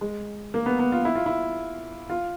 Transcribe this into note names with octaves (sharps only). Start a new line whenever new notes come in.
G#3
A#3
B3
B3
F4
E4
F4
E4
F4